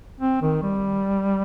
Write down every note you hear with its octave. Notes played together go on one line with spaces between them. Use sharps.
C4
D#3
G3